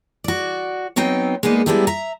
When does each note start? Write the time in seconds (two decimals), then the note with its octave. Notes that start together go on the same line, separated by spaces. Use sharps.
0.24 F#4 D5
0.96 F#3 B3 C4 D#4 G5
1.43 G#3 A#3 B3 D#4 D5
1.66 G3 G#3 B3 D4 E4 G4
1.87 E5 A#5